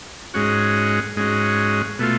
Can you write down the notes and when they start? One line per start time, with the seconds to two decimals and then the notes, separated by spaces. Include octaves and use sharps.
0.34 G#2 G#3 C#4 F#4
1.16 G#2 G#3 C#4 F#4
1.99 B2 A3 F4